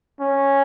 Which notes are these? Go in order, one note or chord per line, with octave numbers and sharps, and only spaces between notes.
C#4